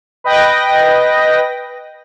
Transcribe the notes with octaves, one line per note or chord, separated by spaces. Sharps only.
B4 D#5 G5 A#6